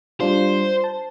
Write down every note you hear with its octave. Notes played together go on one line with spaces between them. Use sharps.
G3 D4 F4 C5
A5